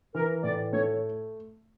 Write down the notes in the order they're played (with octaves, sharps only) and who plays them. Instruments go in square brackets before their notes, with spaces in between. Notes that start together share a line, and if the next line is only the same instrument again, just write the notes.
[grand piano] E3 [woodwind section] A#4
[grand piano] A2 [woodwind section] D5
[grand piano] A3 [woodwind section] C#5